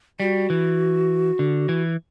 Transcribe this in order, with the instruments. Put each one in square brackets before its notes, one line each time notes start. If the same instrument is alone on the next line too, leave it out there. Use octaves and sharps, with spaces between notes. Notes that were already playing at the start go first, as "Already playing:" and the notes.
[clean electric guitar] G3 [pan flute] F#4
[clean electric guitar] E3
D3
E3